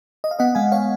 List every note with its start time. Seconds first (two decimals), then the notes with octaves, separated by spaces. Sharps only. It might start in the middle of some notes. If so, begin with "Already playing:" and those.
0.24 D#5
0.31 F5
0.39 B3 D#5 F#5
0.55 G#3 F5 G#5
0.72 C#5 F5